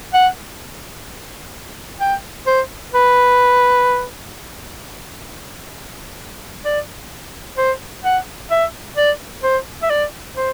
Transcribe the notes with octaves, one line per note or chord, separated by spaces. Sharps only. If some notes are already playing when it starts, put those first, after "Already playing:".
F#5
G5
C5
B4
D5
C5
F#5
E5
D5
C5
E5
D5
C5